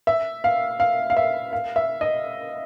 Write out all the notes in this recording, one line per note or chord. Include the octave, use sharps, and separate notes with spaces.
E5
F5
F5
F5
E5
F5
E5
D#5